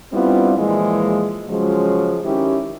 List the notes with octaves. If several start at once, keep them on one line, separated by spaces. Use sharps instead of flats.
G3 B3 C4 D4 E4 F4
A#2 E3 F3 G#3
C#3 F3 F#3 G#3
D#3 C#4 E4 G4